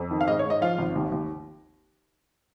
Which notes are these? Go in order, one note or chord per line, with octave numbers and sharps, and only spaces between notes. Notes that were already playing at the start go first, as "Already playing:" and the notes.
Already playing: F2
D#3
F5
G#2 D#5
C#5
G#2 D#5
F3 F4 F5
G#1
D#2
D#2